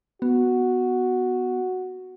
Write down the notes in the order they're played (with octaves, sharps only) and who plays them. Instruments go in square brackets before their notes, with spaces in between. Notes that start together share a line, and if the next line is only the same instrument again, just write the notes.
[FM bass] B3 [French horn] F#4